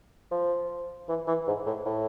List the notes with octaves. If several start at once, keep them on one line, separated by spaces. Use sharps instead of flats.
F3
E3
E3
G#2
A2
A2